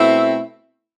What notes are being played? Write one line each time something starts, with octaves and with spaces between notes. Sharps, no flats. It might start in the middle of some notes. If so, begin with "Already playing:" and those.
Already playing: B2 A3 C4 E4